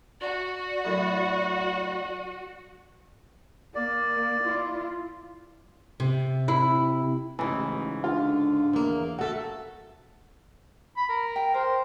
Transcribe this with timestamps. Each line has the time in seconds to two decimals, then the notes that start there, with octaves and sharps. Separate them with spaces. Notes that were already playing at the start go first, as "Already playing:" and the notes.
0.21 F#4 D5 F#5
0.85 F#2 A2
3.75 A#3 D5
4.44 E4 F4
6.00 C3
6.48 E4
7.39 A1 G#2 C#3 E3
8.04 D3 F4
8.73 E2 A#3
9.19 A3 F#4 A4 E5
10.97 B5
11.09 A#4
11.36 G5
11.54 A#4 C5